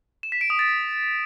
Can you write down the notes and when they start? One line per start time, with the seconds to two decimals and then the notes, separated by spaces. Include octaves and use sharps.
0.23 E7
0.32 B6
0.41 D7
0.50 D#6
0.59 A6